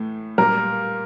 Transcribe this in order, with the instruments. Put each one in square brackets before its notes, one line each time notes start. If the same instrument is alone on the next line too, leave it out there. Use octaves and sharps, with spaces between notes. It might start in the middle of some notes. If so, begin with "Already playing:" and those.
Already playing: [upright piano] A2 E3 A3
[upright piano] A#2 G3 A#3 [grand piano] A#4